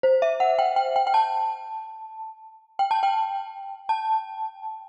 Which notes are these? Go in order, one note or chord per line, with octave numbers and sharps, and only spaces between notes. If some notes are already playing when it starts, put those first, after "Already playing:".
C5
E5
F#5
G5
G5
G5
G5
A5
G5
A5
G5
A5